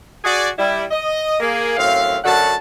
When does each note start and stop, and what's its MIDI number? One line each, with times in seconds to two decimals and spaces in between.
0.24 0.49 66
0.24 0.49 68
0.24 0.49 74
0.59 0.85 55
0.59 0.85 64
0.91 1.36 75
1.40 1.73 58
1.40 1.73 68
1.77 2.18 42
1.77 2.18 45
1.77 2.18 60
1.77 2.18 77
2.24 2.54 42
2.24 2.54 50
2.24 2.54 66
2.24 2.54 78
2.24 2.54 81